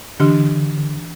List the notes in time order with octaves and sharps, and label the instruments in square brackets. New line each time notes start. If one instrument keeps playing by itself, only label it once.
[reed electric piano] D3 [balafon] E3 D4 G4